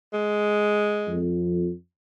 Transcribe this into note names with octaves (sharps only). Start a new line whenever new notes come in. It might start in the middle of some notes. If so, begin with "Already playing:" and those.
G#3
F2